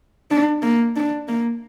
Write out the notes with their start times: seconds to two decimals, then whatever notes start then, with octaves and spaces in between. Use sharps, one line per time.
0.31 D4
0.62 A#3
0.96 D4
1.28 A#3